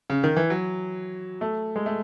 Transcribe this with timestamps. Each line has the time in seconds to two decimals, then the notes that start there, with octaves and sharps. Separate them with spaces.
0.10 C#3
0.24 D#3
0.36 E3
0.50 F#3
1.41 A3
1.76 G#3
1.86 A3